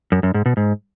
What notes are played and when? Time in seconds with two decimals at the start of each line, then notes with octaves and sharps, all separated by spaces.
0.12 F#2
0.23 F#2
0.34 G#2
0.46 B2
0.57 G#2